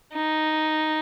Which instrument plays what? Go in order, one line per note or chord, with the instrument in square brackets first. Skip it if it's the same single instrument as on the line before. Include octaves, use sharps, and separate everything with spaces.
[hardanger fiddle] D#4